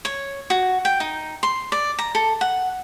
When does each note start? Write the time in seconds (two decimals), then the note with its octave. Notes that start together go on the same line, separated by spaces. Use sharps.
0.05 C#5
0.50 F#4
0.85 G5
1.00 D#4
1.43 C6
1.72 D5
1.99 A#5
2.15 A4
2.41 F#5